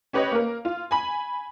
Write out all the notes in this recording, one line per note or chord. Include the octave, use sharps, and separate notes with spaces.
C#4 G4 B4 C#5 D#5
A#3 A#4
F4
G#5 B5